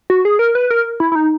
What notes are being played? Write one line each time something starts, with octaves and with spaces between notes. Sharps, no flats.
F#4
G#4
A#4
B4
A#4
E4
E4
D#4